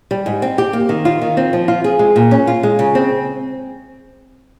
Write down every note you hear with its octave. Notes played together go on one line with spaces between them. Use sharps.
G3
G#2
C4
G4
A#3
D#3
F4
D#3
C4
F3
F4
G#4
G#3
A#2
C#4
F4
G#3
C#3
C4